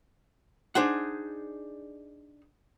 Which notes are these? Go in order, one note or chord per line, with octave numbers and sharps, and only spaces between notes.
D4 D#4 G#4 C5 F#5